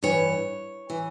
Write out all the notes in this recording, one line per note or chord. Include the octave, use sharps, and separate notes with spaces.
G2 E3 C#5
E3